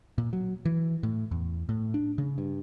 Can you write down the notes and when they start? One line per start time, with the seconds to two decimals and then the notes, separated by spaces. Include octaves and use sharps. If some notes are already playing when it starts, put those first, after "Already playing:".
0.18 A#2
0.33 F#3
0.65 E3
1.03 A2
1.31 E2
1.69 A2
1.94 D4
2.18 C#3
2.38 G2